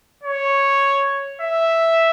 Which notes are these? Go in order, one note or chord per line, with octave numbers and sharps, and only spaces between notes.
C#5
E5